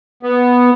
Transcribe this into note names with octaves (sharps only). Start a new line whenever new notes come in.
B3